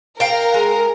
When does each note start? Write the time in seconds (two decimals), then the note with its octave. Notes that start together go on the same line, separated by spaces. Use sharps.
0.20 A#4 F5 G5
0.54 G#3